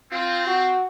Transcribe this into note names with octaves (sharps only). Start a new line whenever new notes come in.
C4 F4
F#4